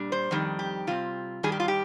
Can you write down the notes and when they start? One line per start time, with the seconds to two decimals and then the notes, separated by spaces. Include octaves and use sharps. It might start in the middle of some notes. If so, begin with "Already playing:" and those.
Already playing: A#2 G3 D4
0.12 C5
0.31 F2 D#3 G3
0.59 G4
0.87 C3 G3 C4 F4
1.43 G2 D#3 G3 G#4
1.52 G4
1.60 F4
1.68 G4